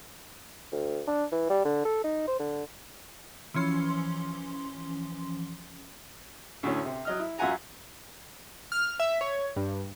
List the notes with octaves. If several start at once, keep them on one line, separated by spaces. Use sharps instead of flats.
D2
D4
E3
G3
D3
A4
D#4
C5
D3
E3 F3 C#4 C6
D2 A2 C#4
C3
F#3 D#5 F6
E4
F#2 F4 E5 F#5 G#5 A#5
F6
E5
C#5
G2